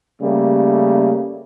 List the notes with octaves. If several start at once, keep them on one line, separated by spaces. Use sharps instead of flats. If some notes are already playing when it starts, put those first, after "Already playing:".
C#3 G3 A3 A#3